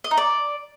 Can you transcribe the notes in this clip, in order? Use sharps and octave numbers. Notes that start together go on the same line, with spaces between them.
D#5
D#4
D5